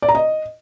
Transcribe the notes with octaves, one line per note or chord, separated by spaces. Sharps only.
D5
A#5
D#5